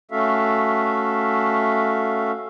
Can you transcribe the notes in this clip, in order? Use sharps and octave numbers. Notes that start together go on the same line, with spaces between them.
A3 C#4 F#4 A4 E5 F5